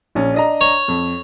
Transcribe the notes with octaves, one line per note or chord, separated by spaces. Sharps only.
A#1 C#4
D4 D#5 A#5
C#5
F2